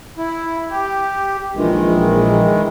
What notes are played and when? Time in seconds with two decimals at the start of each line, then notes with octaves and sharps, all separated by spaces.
0.18 E4
0.71 G4
1.55 A#1 D#3 E3 G#3